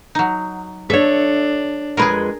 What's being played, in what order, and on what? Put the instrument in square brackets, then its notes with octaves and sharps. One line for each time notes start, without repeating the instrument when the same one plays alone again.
[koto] F#3 D#4
[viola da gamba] D4 [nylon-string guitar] A4 C#5 [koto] E5
[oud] F2 G#3 B4 [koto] G#4 A#4